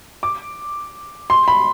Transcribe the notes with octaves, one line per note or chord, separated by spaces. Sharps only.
D6
C6
B5